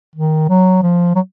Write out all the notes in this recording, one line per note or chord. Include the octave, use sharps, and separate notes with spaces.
D#3
F#3
F3
F#3